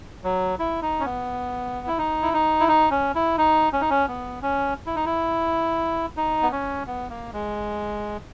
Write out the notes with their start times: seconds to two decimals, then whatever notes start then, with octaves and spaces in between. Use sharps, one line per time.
0.24 F#3
0.59 E4
0.82 D#4
1.00 C#4
1.05 B3
1.87 E4
1.98 D#4
2.22 E4
2.33 D#4
2.60 E4
2.68 D#4
2.91 C#4
3.15 E4
3.38 D#4
3.73 C#4
3.81 D#4
3.90 C#4
4.08 B3
4.42 C#4
4.86 E4
4.96 D#4
5.06 E4
6.17 D#4
6.43 B3
6.52 C#4
6.87 B3
7.10 A#3
7.33 G#3